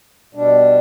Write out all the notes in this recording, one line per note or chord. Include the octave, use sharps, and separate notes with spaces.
B2 G3 D4